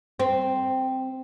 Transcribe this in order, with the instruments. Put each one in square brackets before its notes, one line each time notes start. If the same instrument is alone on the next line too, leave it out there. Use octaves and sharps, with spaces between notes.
[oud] C4